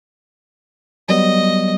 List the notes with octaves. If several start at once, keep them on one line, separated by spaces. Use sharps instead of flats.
F#3 G3 B3 D#5